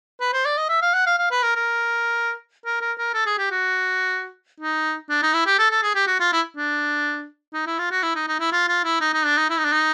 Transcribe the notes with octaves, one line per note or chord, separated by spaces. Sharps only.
B4
C5
D5
D#5
E5
F5
F#5
F5
F5
B4
A#4
A#4
A#4
A#4
A#4
A4
G#4
G4
F#4
D#4
D4
D#4
E4
G4
A4
A4
G#4
G4
F#4
F4
E4
D4
D#4
E4
F4
F#4
E4
D#4
D#4
E4
F4
F4
E4
D#4
D#4
D4
D#4
E4
D#4
D4
D#4